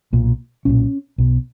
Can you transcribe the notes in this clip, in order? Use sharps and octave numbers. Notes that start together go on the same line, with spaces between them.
B1 A#2
B1 A#2 C#4
B1 B2